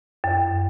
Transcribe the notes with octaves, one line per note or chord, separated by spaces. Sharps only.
F#2